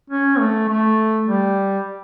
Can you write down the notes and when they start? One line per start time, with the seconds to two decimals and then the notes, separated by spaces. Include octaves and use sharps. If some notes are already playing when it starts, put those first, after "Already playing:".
0.10 C#4
0.39 A3
0.68 A3
1.27 G3